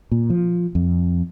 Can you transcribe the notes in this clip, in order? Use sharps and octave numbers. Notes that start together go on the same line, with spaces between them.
A#2
F3
F2